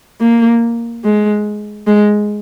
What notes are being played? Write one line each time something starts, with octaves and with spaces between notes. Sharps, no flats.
A#3
G#3
G#3